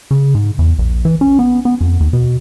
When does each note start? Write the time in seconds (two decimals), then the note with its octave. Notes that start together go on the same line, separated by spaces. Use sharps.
0.11 C#3
0.35 G#2
0.59 E2
0.79 A#1
1.05 E3
1.21 C#4
1.39 B3
1.65 B3
1.81 F2
2.00 D#2
2.13 B2